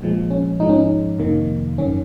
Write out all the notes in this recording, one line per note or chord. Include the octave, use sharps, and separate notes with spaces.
A#1 A#2 F3 G#3
C#4
G#2 F3 G#3 D#4
C#4
D#4
F2 C3 D#3 A#3
G#1 F#2 D#3 C#4